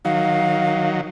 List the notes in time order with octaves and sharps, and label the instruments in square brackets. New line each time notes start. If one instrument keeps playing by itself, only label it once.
[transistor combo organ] D#3 F#3 [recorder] F5